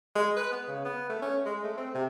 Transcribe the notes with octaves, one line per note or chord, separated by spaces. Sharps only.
G#3
B4
B3
C#3
B3
A3
C#4
G#3
A3
C4
C3